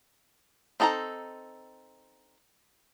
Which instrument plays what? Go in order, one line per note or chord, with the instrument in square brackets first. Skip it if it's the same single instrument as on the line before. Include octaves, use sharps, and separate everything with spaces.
[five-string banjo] C4 D#4 A4 C#5 A#5